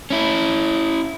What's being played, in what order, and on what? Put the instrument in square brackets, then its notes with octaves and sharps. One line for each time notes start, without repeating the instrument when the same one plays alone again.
[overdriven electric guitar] C#4 E4